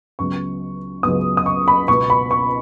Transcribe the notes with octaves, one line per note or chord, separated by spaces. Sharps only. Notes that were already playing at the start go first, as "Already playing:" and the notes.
C#2 C#3 F#3 B3 C#6
C#2 C#3 F#3 B3 D#6
D#6
C#6
B5
C#2 B2 B3 C#6
B5
C#6